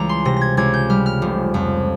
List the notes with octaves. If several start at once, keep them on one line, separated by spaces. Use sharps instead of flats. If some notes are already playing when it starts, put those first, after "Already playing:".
Already playing: C#2 E3 G3 A#5
C6
C3 A#6
G#6 A#6
C#2 G#6
G6
G3 F6
F6
F1
F2